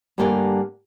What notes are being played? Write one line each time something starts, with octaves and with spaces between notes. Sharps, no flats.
G2 D3 G3 A#3 G5 G#5